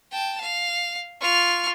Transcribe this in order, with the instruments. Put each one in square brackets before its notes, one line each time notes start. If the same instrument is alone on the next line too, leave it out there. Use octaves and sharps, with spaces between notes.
[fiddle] G5 A5
F5
[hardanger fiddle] F4 [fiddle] C#6 F6